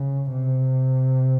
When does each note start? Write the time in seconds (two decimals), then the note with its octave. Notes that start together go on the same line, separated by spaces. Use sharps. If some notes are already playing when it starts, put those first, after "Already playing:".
Already playing: C#3
0.32 C3